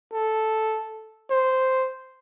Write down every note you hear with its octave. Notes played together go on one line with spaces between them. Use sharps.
A4
C5